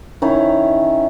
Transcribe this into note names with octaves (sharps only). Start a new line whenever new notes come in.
D#3 C#4 E4